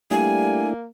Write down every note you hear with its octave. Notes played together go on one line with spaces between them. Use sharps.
G3 A3 A#3 D4 E4 G#5